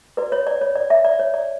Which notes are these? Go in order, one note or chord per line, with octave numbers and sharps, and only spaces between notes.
F#4 B4 D5
C#5
D5
C#5
D5
E5
D5
C#5
D5